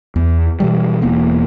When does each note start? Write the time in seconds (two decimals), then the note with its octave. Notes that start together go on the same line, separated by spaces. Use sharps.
0.16 E2
0.60 B2 E3 G3
1.02 E1 E2 A#3 B3